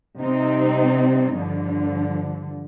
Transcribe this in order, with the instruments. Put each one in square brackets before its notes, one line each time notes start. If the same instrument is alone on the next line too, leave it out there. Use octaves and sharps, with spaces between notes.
[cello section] C3 G3 C4 D#4
G2 D3 F3